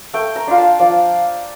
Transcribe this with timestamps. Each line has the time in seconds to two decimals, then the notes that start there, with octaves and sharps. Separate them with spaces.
0.14 A3 G5
0.36 A#5
0.47 D4 F4
0.58 A5
0.80 F3 D5